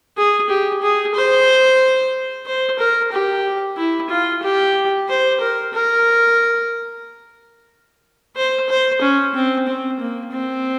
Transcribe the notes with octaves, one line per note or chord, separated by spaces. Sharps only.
G#4
G4
G#4
C5
C5
A#4
G4
E4
F4
G4
C5
A#4
A#4
C5
C5
C#4
C4
C4
A#3
C4